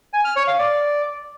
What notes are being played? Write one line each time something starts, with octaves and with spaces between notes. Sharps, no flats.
G#5
F6
C#5
F5
D5